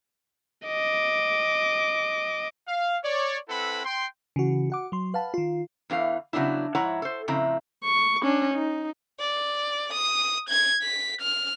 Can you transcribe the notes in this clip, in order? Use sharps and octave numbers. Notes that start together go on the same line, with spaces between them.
D#5 D6
F5
C#5 D5
C4 E4 A4 B4 F#5 B5
G5 C6
C#3 E3 F#4
F#4 F#5 D6
F#3 C6
B4 F5 F#5 A5 B5
D#3 F4
E2 E3 F4 F5
C#3 F#3 B3 D4 E4
G#2 F3 E4 C#5 F#5 A#5
A4 C5
F2 A2 C#3 C4 E4 A#5
C#6
C#4 D4
D#4
D5
D#6
G#6
B6
F6